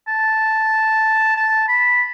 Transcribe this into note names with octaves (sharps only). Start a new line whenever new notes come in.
A5
A5
B5